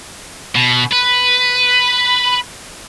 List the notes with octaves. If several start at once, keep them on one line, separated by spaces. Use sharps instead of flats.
B2
B4